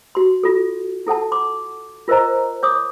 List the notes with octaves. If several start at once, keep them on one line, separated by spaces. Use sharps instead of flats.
F#4 C6
F4 A4
E4 A4 F#5 A5
C6 D6
F4 A#4 C5 D#5 A#5
C#5 D6 D#6